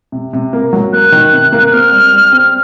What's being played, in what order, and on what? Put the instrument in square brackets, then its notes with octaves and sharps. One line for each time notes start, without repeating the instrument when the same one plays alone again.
[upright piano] C3
C3
A#3
F#3
[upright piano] A#3 [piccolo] F#6
[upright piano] D#3
C3
A#3
[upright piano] C4 [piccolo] F6
[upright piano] G3
G3
C4